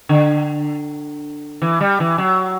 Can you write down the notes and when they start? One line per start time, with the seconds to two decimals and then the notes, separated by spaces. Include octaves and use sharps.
0.09 D3
1.62 E3
1.81 G3
2.00 E3
2.18 F#3